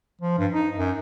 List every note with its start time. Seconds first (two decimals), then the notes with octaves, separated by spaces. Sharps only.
0.21 F3
0.39 G2
0.53 D#4
0.78 F#2